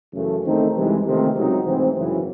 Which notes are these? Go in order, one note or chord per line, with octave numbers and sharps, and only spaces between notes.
F#2 C#3 E3 A3
E2 D#3 A3 C4 D#4
C2 C3 E3 G#3
C#2 C3 D#3 A3 C4
C#2 C3 F#3 C4 D#4
A1 G#2 E3 C4
F#2 C#3 E3